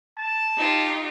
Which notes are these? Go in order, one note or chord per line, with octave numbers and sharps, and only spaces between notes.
A5
D#4 F4 G4